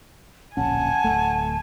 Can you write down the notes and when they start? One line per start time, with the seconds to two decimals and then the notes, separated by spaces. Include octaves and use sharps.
0.57 D1 A#1 C#4 F#5 G#5 A5
1.04 D1 D#2 A3